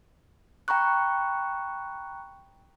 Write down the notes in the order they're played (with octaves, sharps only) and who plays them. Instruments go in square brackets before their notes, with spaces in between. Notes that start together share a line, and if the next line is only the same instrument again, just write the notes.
[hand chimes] G5 A#5 B5 C#6 F#6